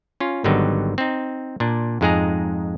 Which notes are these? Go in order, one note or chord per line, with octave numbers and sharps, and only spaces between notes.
C#4 F4
G#1 D3 F#3 G3 B3 D#4
C4 D#4
A#2 D4
F2 G#2 G#3 D#4 G#4 A#5